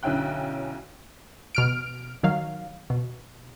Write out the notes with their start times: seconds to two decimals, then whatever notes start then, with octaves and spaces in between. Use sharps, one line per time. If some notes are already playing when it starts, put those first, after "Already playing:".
0.03 B1 D3 C#4 E4 G5 F#6
1.55 B2 F6 D7
2.23 D#3 F#3 F5
2.90 B2